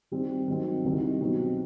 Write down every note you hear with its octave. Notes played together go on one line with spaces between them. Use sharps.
D#3 G3 C4
D#3 F#3 C4
C2 C3 D#3
B2 F#3 C4 D#4 F#4